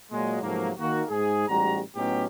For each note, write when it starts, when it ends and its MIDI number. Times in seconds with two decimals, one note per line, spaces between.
0.12 0.39 46
0.12 0.39 54
0.12 0.39 56
0.42 0.71 44
0.42 0.71 48
0.42 0.71 53
0.42 0.71 54
0.42 0.71 57
0.42 0.71 58
0.79 1.03 51
0.79 1.03 58
0.79 1.03 66
1.09 1.45 44
1.09 1.45 68
1.48 1.80 33
1.48 1.80 44
1.48 1.80 55
1.48 1.80 66
1.48 1.80 82
1.96 2.25 45
1.96 2.25 54
1.96 2.25 59
1.96 2.25 61
1.96 2.25 63
1.96 2.25 67